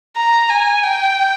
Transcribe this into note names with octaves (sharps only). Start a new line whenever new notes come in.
A#5
G#5
G5